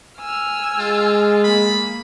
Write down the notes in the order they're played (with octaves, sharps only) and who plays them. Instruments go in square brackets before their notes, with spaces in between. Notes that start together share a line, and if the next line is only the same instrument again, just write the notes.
[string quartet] G#5 E6 F6
[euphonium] G#3 [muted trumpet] F4
[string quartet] A#3 [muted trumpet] B5